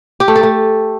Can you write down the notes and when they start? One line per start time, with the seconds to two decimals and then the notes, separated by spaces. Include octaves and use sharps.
0.20 G4
0.28 A3
0.36 A4
0.43 A3